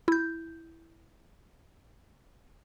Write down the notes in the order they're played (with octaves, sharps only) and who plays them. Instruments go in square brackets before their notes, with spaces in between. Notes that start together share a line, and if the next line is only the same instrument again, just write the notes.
[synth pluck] E4 G6